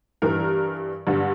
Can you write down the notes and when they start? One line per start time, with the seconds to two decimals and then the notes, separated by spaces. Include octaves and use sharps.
0.22 G2 E3 G3 A#4
1.07 G2 D3 G3